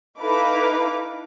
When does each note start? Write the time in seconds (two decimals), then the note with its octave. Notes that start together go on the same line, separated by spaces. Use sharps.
0.20 D#4 E4 A4 B4 F5 D6